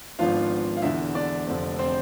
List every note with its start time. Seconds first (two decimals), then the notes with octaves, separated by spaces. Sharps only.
0.19 G#1 G#2 F3 B3 D4 F4 F5
0.77 F5
0.82 E1 E2 D3 E4 E5
1.15 D4 D5
1.47 F1 F2 D3 A3 C4
1.79 C4 C5